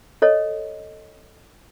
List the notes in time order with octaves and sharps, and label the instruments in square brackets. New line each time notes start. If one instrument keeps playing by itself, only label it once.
[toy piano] A4 C#5 D#5